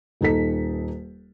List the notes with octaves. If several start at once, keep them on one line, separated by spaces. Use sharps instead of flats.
D#1 D#4 A4 B6